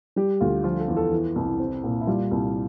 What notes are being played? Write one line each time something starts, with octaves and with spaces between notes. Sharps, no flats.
G3 G4
D2 F4
F3 F4
A4
E2
A4
E3
C2
C4
A#2
E4
G3 F4
C2